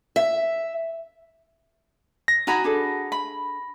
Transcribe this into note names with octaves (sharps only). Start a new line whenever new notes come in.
E5
A#6
D#4 F#4 G#5 A#5 B5
D4 G#4 A4
B5